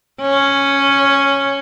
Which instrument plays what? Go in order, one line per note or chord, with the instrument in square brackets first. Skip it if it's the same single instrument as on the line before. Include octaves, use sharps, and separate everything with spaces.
[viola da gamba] C#4